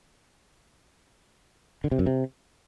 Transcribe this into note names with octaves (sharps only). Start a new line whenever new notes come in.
D3
C3
F#2
C3